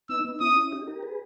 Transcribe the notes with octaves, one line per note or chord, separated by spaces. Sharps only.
B3 D#4 E6
B3 D#4
C#4 E4 D#6
C#4 E4
D#4 G4
G4 A#4
G#4 B4